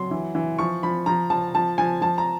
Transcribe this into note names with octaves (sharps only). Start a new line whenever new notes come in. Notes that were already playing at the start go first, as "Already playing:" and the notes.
Already playing: F#3 C6
E3
E3
F3 C#6
F3 B5
F3 A#5
F3 A5
F3 A5
F3 G#5
F3 A5
A#5